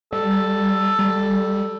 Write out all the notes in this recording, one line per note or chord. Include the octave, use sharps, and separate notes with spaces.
G3 A4
G3